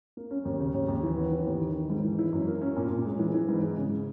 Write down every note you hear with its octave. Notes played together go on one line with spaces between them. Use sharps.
A#3
C#4
D#2
C#3
D#2
D#2
E3
B3
E3
D#2
D#3
D#3
G#2
E3
E4
F#2
A#3
C#4
A#2
A#2
G#3
E3
E3
G#2
G#3
C#3